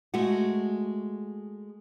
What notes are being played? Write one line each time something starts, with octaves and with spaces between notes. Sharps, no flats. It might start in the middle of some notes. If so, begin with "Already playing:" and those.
G#3 A3 F#4